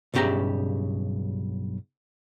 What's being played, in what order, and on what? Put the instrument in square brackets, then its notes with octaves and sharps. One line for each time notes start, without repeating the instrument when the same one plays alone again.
[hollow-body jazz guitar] B1 G2 C#3 G4 E5 A#5